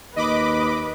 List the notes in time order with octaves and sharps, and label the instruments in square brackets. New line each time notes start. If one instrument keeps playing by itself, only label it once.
[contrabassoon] D#2 [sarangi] B4 [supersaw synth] D#5 B5 D6